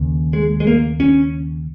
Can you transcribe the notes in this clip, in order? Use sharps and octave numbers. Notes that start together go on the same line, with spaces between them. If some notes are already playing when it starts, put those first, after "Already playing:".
Already playing: D#2 C#3
G#3
G#3
A#3
C#4